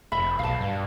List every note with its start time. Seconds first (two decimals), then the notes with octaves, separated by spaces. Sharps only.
0.12 F1 D#5 E5 B5
0.39 B1 F5 A5
0.60 G2